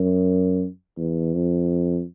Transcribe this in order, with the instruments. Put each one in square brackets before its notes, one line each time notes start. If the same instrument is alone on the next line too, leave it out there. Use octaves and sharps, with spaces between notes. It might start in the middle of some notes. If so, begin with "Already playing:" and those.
Already playing: [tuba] F#2
E2
F2